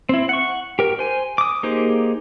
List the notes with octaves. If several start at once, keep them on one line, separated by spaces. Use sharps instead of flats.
C4 E4
F#5 C#6
G4 A#4
C5 G#5
D6 D#6
A#3 D#4 G4 G#4 C5